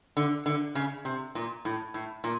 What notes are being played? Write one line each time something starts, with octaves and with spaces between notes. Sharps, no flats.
D3
D3
C#3
C3
A#2
A2
A2
A#2